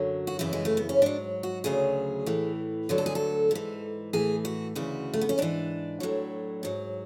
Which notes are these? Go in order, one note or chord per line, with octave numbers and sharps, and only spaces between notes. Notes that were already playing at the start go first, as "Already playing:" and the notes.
Already playing: F#2 D3 F#3
F#4
F#2 C#3 E3 E4
G#3
A3
B3
C#4
G#2 F#3 D4
F#4
D2 C#3 F#3 G#4
A2 E3
D2 D3 F#3
A4
G#4
A4
G#2 E3
A2 E3 G#4
F#4
D2 C#3 E3 F#4
A3
B3
C#4
G#2 E3 D4
A2 F#3
G#2 F#3